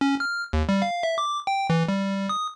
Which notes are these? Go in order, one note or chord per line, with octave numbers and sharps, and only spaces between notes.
C#4
F6
D#2
G3
F5
E5
D6
G5
E3
G3
D#6